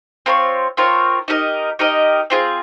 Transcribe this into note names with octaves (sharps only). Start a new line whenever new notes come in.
C4 F4 A#4 C#5
C4 F4 A#4 C#5
D#4 G4 A#4 D#5
D#4 G4 A#4 D#5
C4 F4 G#4